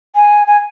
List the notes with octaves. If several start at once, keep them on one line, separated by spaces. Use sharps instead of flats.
G#5
G#5